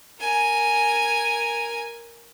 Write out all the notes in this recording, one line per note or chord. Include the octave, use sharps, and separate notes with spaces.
A#4 G#5